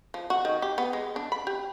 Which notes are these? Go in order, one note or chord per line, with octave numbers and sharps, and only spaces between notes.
F3
F#4
D#3
G4
B3
G#3
D4
B5
G4